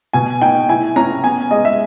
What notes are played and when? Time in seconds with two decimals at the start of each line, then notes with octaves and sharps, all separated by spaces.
0.13 B2 G#5
0.41 D#4 G5
0.69 E4 G#5
0.96 C#4 A#5
1.23 B3 G#5
1.51 G#3 D#5
1.65 E5